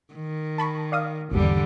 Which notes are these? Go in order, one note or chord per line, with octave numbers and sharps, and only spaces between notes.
D#3
A5 B5 C#6
D5 F5 D#6
G#1 E2 D3 G3